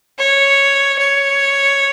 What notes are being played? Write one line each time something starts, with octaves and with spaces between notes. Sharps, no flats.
C#5
C#5